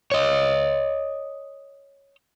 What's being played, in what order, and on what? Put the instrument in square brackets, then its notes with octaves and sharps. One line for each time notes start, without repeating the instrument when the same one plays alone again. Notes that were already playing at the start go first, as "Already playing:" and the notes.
[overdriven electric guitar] C#5 D#5